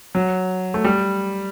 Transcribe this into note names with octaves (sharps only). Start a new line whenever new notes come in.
F#3
A3
G3